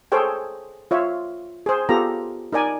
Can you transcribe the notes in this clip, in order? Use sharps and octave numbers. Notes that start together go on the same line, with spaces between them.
G#4 A4 C5 C#5 G5
F4 C#5 E5
G#4 C5
B3 F4 G4 A4 A#5
D#4 A#4 D5 G#5